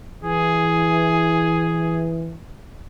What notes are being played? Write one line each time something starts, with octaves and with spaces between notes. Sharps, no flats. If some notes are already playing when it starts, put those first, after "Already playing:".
E3 G#4